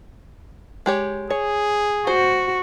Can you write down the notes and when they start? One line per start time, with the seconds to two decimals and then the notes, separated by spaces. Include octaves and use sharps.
0.86 G#3 G4 C#5
1.30 G#4 C#5
2.07 F#4 C5